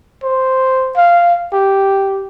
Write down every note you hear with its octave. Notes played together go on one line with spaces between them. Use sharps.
C5
F5
G4